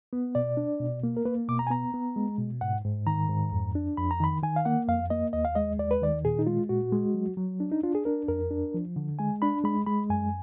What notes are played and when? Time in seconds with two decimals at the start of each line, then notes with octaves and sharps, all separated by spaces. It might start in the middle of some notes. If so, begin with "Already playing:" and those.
0.13 B3
0.35 B2 D5
0.57 D4
0.80 B2
1.04 A#3
1.17 A#4
1.25 A#3 B4
1.49 B2 D6
1.59 A#5
1.67 G#5
1.70 B3 A#5
1.94 B3
2.16 G#3
2.39 B2
2.61 G#2 F#5
2.85 G#2
3.07 D#3 A#5
3.29 G#2
3.52 F2
3.75 D4
3.97 F2 B5
4.11 A#5
4.20 D#3 B5
4.43 D#3 G#5
4.56 F5
4.65 A#3 F#5
4.89 F2 F5
5.10 A#3 D#5
5.33 D#2 D#5
5.45 F5
5.55 G#3 D#5
5.79 D#2 D5
5.91 B4
6.02 D#3 D5
6.25 A#2 G#4
6.39 D#4
6.47 G#3 F4
6.69 A#2 F#4
6.92 G#3
7.14 F#3
7.37 F#3
7.60 D4
7.72 D#4
7.83 D4 F4
7.95 G#4
8.05 D4 A#4
8.28 F2 A#4
8.51 D4
8.74 F3
8.96 D3
9.19 G#3 G#5
9.42 D4 B5
9.64 G#3 B5
9.86 G#3 B5
10.10 F#2 G#5